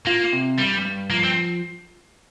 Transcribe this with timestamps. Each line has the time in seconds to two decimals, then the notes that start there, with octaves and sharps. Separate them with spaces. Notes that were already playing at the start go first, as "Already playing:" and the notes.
0.06 A#3 F4
0.33 C3
0.59 G2 G3
0.85 G2
1.10 F3 A#3
1.24 C4